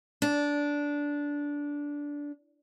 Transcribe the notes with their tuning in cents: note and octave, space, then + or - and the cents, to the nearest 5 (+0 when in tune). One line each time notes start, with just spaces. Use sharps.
D4 -15